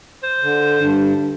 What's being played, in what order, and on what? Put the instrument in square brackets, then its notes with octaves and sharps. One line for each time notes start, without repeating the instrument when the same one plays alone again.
[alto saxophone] C5
[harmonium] D3
[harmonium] G2 [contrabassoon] D3